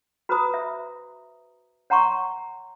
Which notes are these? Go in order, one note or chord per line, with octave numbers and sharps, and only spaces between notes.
F#4 B4 C5 A#5 B5 D#6
E5
C#5 F#5 A#5 C6 C#6